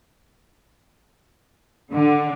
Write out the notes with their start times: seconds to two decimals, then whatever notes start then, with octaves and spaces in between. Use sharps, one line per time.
1.93 D3